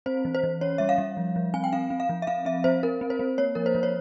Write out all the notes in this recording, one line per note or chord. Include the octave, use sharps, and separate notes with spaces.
C4 C5
E3
C5
E3
C#4 C#5
G3 E5
F5
G3
F3
F3
C4 G#5
G5
C4 F5
C4
F5
F3
E5
C4 F5
C4 E5
C4 C5
C4 A#4
C4
C5
C4
A#3 C#5
F3 A#4
C5
F3
C#5